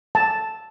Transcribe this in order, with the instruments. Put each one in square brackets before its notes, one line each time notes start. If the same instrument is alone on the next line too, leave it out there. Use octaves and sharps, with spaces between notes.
[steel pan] A5